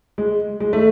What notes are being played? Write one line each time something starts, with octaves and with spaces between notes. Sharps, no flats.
G#3
G#3
A3